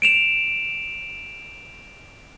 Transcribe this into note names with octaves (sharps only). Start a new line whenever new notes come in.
D7 E7 F7